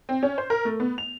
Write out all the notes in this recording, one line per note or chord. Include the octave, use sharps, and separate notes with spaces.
C4
C#4
C5
A#4
A3
B3
F7